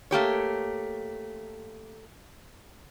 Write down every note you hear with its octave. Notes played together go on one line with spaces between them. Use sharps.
A3 A#3 G4 C#5